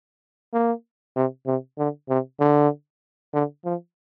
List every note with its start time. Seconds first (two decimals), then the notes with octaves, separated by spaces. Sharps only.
0.53 A#3
1.16 C3
1.47 C3
1.78 D3
2.09 C3
2.40 D3
3.34 D3
3.65 F3